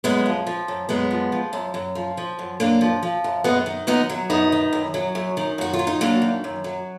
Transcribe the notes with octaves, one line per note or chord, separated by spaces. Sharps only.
F#2 G#3 B3
F3
F3
F#2
F#2 G#3 B3
F3
F3
F#2
F#2
F3
F3
F#2
F#2 A#3 D4
F3
F3
F#2
F#2 G#3 B3
D#3
F#2 B3 D#4
F#3
F#2 B3 D#4
D#3
F#2
F#3
F#2
D#3
F#2 F#4
F4
F#3
D#4
F#2 A#3 D4
D#3
F#2
F#3